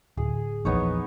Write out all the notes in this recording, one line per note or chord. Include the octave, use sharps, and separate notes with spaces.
D1 G#4
A#1 E2 B3 D#4 C#5